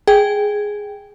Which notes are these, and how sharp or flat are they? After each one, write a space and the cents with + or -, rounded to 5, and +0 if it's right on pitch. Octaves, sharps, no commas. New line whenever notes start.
G#4 +0 G5 +0